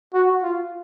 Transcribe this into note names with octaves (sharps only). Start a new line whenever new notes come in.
F#4
F4